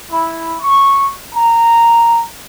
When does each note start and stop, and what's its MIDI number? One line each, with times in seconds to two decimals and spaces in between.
0.11 0.55 64
0.61 1.08 85
1.34 2.21 82